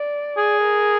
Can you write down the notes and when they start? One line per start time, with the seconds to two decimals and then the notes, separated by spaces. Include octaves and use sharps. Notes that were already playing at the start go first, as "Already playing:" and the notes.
Already playing: D5
0.37 G#4
0.62 A#4